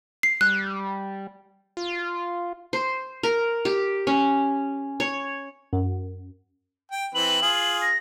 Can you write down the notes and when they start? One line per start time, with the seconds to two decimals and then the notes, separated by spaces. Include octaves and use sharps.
0.23 C7
0.41 G3 F#6
1.77 F4
2.73 C5
3.23 A#4
3.65 G4
4.07 C#4
5.00 C#5
5.73 F#2
6.92 G5
7.15 E3 C4 B4 F#7
7.42 F4 G#4
7.82 A#6